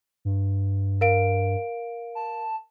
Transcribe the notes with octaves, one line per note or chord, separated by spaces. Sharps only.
G2
A#4 F5 D7
A5